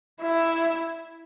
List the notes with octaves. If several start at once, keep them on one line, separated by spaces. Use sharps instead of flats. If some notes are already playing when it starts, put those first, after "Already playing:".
E4